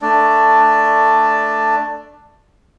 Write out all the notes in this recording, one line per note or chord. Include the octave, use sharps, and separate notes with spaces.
A3 D4 D5